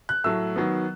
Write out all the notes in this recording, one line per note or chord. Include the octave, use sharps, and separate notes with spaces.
F#6
A2 F#3 A3 E6
D#3 F#3 B3